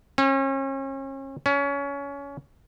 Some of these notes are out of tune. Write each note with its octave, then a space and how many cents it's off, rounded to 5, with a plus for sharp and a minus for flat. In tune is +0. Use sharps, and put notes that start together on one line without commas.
C#4 -35
C#4 +25